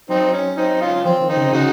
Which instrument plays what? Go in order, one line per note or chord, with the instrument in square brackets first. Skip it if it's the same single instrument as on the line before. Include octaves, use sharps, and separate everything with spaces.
[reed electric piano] F#3 [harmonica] C4 D#4
[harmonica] C#4
C4 D#4
C#4 F4
[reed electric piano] F3 [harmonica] C4
[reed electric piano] D#3
[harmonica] C4 D#4
[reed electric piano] C#3
[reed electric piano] C#3 [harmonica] D#4 F#4